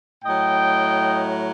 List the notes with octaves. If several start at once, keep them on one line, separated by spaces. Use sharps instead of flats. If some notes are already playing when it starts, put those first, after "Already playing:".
A2 F#3 D#5 G5